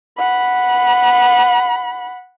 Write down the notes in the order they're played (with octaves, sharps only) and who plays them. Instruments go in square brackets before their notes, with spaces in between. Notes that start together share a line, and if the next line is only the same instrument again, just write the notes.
[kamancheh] F#5 B5